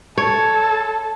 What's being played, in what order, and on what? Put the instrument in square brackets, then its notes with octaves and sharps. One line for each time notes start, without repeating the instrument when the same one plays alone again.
[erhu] A4 [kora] C#5